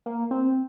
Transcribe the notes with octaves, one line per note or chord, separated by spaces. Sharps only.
A#3
C4